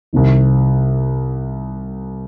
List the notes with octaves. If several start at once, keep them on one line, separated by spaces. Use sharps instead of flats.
C2 C3 D#3